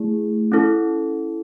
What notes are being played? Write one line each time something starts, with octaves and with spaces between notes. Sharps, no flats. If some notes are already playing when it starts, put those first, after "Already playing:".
Already playing: A3 E4 G#4
C#4 E4 A4